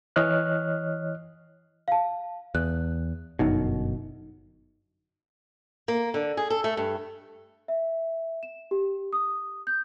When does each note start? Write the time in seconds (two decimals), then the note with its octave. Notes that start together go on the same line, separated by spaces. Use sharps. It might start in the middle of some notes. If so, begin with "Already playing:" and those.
0.16 E3 C#5 D#5 F6 F#6
1.88 F5 A5
2.55 E2 F#6
3.39 G1 F#2 B2 D#4
5.88 A#3
6.14 D3
6.37 G#4
6.50 A4
6.64 A3
6.77 G2
7.68 E5
8.43 E7
8.71 G4
9.13 D#6
9.67 G6